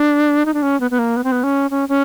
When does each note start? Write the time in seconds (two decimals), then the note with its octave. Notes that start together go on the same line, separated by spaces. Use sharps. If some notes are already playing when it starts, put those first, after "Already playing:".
Already playing: D4
0.46 D#4
0.54 D4
0.62 C#4
0.81 B3
0.91 B3
0.99 A#3
1.17 B3
1.24 C4
1.32 B3
1.44 C#4
1.71 C#4
1.89 C#4